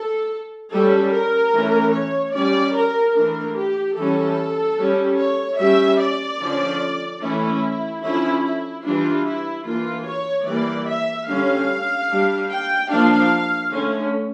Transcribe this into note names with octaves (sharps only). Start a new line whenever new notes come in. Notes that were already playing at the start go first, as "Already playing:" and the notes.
Already playing: A4
G3 C#4 A4
A#4
E3 A3 C#4
C#5
G3 C#4 D5
A#4
E3 A3 D4 A#4
G4
E3 G3 C#4 A4
G3 C#4
C#5
G3 C#4 E5
D5
D3 F3 C#4
E3 A3 C#4 E4
D3 F3 C#4 E4
E4
E3 G3 D4 F4
E4
E3 A#3 D4 F4
C#5
E3 G3 A#3 D5
E5
D3 G3 C#4 F5
G3 D4
G5
F3 A#3 D4 F5
D3 A3 C#4